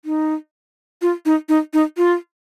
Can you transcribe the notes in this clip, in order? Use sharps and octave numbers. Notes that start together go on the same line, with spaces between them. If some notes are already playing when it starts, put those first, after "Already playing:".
D#4
F4
D#4
D#4
D#4
F4